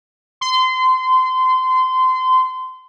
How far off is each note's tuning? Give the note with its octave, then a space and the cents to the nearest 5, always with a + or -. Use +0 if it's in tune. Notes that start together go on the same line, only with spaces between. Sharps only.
C6 -25